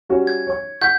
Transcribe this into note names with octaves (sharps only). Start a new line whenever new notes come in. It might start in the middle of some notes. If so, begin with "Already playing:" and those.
G3 C#4 F#4
G#6
C#5 C#6
F#5 C#6 G6 B6